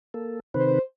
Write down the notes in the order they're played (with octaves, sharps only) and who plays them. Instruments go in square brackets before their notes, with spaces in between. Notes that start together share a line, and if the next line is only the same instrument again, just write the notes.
[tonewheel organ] A#3 A4
[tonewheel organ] C3 D#3 B4 [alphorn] C5